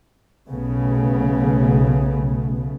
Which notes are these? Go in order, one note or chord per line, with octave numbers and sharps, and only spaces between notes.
B1 C#3 A3 B3